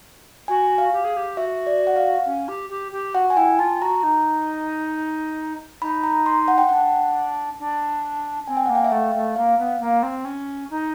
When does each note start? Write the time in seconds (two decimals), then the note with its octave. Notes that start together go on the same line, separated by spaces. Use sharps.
0.48 F#4 G#5
0.78 F5
0.93 G4
1.04 G#4
1.17 G4
1.37 F#4 E5
1.67 D5
1.87 F#5
1.96 F5
2.26 C#4
2.48 G4
2.70 G4
2.92 G4
3.14 F#4 F#5
3.30 G#5
3.37 E4 G5
3.59 F4 A5
3.81 F#4 A#5
4.03 D#4
5.82 D#4 B5
6.04 A#5
6.26 C6
6.48 F#5
6.58 G5
6.69 D4 F#5
7.59 D4
8.48 C4 G#5
8.57 G5
8.66 A#3 F#5
8.75 G5
8.84 E5
8.92 A3 F5
9.15 A3
9.36 A#3 F5
9.58 B3
9.80 A#3
10.03 C4
10.25 C#4
10.70 D#4